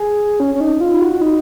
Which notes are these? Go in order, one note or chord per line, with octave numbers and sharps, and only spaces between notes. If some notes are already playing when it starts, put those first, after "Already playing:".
Already playing: G#4
C#4
C#4
D#4
F4
F#4
D#4